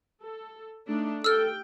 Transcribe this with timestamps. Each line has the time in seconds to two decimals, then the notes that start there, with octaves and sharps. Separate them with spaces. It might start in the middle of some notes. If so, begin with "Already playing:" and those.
0.24 A4
0.86 A3 D4 D#4
1.24 G4 A4 G5 E6 F6